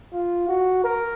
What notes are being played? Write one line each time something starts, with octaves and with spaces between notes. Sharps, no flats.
F4
F#4
A#4